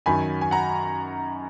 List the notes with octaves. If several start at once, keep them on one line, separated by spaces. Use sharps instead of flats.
F#2 D#3 F#3 G#5 B5
G#5
F#5 A#5